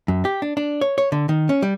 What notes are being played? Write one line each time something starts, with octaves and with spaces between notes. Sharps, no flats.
F#2
G4
D4
D4
C#5
C#5
D3
D#3
C#4
G3